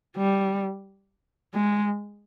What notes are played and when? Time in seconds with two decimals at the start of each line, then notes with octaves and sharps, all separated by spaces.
0.17 G3
1.54 G#3